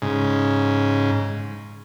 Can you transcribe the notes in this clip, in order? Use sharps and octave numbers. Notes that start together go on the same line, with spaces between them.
G#2 C#3